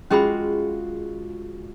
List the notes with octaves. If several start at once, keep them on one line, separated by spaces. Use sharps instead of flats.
G#3 C#4 F4 F#4 G#4 B5